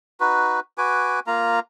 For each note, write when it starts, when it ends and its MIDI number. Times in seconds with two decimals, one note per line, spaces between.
0.20 0.60 63
0.20 0.60 66
0.20 0.60 71
0.78 1.20 66
0.78 1.20 71
0.78 1.20 80
0.78 1.20 86
1.27 1.60 58
1.27 1.60 65
1.27 1.60 82